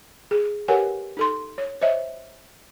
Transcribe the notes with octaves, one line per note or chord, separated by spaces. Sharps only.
G#4
G4 A#4 B4 C#5 F#5 G#5
D#4 A4 C6
C#5
C5 C#5 D#5 E5